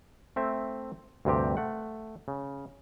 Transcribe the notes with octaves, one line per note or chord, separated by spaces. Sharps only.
A3 C4 E5
D2 G2 C3 C4 G4
A3 F#5
C#3